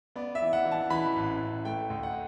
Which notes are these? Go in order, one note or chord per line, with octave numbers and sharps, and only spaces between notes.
B3 D5
E5
E3
F#5
E3
A5
E3 B5
A1
A1
A3 G5
D2
F#5